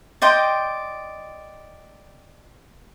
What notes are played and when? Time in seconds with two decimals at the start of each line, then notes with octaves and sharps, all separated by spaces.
0.22 D5 D#5 G5 C6